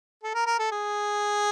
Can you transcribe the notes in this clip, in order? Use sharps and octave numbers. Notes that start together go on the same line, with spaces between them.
A4
A#4
A#4
A4
G#4